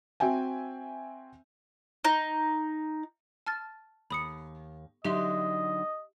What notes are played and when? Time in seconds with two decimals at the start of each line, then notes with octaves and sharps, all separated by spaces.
0.20 C4 F#4 E5 G5 G#5
2.05 D#4
3.46 A5 F6 A6
4.10 D#2 B5 D#6 C#7
5.05 D3 F#3 D#4 G4 D#5 E5 C6